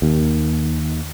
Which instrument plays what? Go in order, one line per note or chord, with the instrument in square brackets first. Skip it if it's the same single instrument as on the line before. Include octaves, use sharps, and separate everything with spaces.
[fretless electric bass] D#2